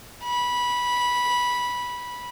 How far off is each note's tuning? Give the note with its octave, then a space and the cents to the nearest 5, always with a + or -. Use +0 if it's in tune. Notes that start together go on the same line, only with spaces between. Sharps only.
B5 -15